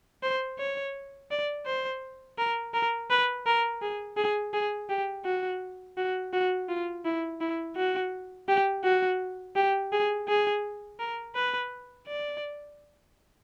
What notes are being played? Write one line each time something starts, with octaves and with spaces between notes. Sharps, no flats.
C5
C#5
D5
C5
A#4
A#4
B4
A#4
G#4
G#4
G#4
G4
F#4
F#4
F#4
F4
E4
E4
F#4
G4
F#4
G4
G#4
G#4
A#4
B4
D5